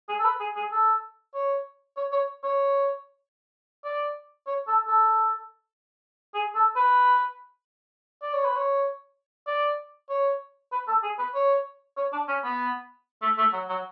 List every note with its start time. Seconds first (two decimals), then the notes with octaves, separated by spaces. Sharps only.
0.09 G#4
0.20 A4
0.25 B4
0.41 G#4
0.57 G#4
0.72 A4
1.35 C#5
1.97 C#5
2.13 C#5
2.44 C#5
3.85 D5
4.47 C#5
4.68 A4
4.88 A4
6.35 G#4
6.55 A4
6.76 B4
8.22 D5
8.33 C#5
8.45 B4
8.56 C#5
9.47 D5
10.10 C#5
10.72 B4
10.88 A4
11.03 G#4
11.19 B4
11.35 C#5
11.97 C#5
12.13 D4
12.29 C#4
12.44 B3
13.22 A3
13.38 A3
13.53 F#3
13.69 F#3